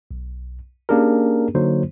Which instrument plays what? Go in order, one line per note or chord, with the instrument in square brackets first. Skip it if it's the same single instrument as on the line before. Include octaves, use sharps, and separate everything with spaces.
[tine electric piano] B1
A#3 C#4 D4 G4 G#4 A#4
D3 F#3 A#3 D#4 C5